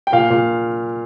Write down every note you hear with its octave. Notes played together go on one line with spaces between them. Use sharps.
G5
A#2 F5
A#2